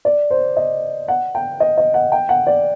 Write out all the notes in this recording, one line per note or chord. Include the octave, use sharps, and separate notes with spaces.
D5
C5
D#5
F#5
G5
D#5
D#5
F#5
G5
F#5
D5